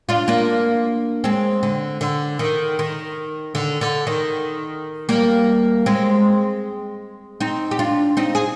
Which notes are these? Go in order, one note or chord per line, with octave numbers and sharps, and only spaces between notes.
D4 F4
A#3 D4
G#3 C4
D3
D3
D#3
D#3
D3
D3
D#3
G3 A#3
G#3 C4
C4 D#4
G4
D4 F4
C4 D#4
G#4